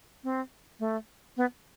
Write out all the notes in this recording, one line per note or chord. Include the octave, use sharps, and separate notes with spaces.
C4
A3
B3